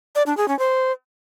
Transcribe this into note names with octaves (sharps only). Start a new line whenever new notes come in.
D5
D4
G#4
C#4
C5